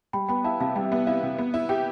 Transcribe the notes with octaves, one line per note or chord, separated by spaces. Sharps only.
G3 G5 B5
B3 G5 B5
E4 F5 A5
C3 F5 A5
G3 E5 G5
B3 E5
E4 F5
C3
B3
E4
G4 E5 G5